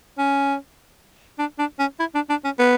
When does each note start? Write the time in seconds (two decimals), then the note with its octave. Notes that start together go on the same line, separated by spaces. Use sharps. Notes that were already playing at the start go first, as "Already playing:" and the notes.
0.18 C#4
1.39 D4
1.59 D4
1.79 C#4
1.99 E4
2.15 D4
2.29 D4
2.44 C#4
2.59 B3